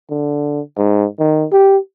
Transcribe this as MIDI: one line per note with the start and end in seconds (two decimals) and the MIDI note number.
0.10 0.61 50
0.78 1.06 44
1.19 1.46 51
1.52 1.77 67